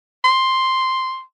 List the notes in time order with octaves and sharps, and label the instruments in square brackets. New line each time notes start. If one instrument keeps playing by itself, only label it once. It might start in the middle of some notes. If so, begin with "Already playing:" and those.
[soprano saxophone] C6